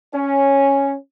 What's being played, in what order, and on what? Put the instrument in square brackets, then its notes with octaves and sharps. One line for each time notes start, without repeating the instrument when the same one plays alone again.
[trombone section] C#4